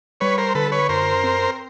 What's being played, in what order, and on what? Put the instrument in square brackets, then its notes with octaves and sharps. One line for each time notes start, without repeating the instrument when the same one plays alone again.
[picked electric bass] G3 [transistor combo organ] B4 C#5
[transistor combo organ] A#4 C5
[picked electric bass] D3 [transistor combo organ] A4 B4
[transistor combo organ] B4 C#5
[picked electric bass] F#2 [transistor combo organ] A#4 C5
[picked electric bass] C4